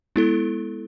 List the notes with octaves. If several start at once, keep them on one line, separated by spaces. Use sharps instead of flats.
G#3 B3 E4 A4